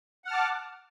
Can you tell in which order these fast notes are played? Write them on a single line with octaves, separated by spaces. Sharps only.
F#5 F6 A5 D6